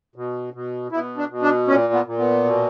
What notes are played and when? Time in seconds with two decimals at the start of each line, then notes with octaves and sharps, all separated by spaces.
0.16 B2
0.54 B2
0.92 B2 E4
1.17 D4
1.30 B2
1.42 D4
1.67 A#2 C#4
1.93 B3
2.06 A#2
2.18 B3
2.44 B2